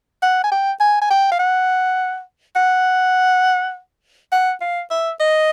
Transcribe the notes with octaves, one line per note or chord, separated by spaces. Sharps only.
F#5
G#5
G5
G#5
G#5
G5
F5
F#5
F#5
F#5
F5
E5
D#5